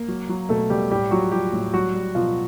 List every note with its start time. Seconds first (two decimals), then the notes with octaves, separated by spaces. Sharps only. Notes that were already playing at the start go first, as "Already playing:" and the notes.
Already playing: A#3
0.08 F#3
0.29 F#3
0.49 B2 A3 A4
0.70 B2 G3 G4
0.90 A2 G3 G4
1.11 F3 F#3 F#4
1.32 F3 G3 G4
1.53 A2
1.74 F#3 G3 F#4
1.94 G3
2.15 B2 F3 F4